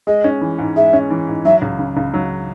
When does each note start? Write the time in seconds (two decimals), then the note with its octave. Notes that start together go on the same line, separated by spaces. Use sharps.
0.07 G#3 D#5
0.24 C#4
0.41 E3
0.59 G#2
0.76 G#3 E5
0.93 C#4
1.10 E3
1.28 G#2
1.45 F#3 E5
1.62 C#2
1.79 C#3
1.97 C#2
2.14 F#3